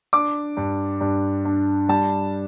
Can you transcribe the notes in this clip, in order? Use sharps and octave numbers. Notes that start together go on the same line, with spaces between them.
D4 D6
G2
G2
D4
G3 A5